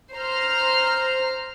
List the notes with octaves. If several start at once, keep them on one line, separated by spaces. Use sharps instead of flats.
C5 A#5 F6